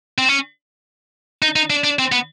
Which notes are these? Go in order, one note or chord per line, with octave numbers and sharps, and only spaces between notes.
C4
C#4
D#4
D#4
D4
D4
C4
B3